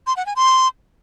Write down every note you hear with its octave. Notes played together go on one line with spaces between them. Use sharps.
C6
F#5
G#5
C6